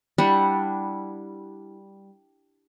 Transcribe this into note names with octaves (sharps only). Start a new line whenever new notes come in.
G3 D4 E4 F#5